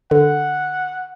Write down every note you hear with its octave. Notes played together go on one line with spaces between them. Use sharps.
D3 F#5